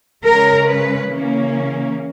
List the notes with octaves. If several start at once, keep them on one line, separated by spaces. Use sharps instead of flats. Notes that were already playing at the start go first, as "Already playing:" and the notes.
C#3 G#3 C#4 A#4
B4
C#3 E3 A#3 C#4